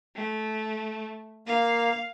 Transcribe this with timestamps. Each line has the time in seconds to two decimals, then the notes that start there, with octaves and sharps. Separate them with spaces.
0.16 A3
1.47 A#3 F5